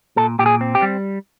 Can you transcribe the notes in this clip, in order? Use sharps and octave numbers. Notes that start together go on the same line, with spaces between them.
A#2 A4
A#2 G4
G#4
C4
G4
G3